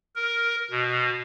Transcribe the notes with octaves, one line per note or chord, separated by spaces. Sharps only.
A#4
B2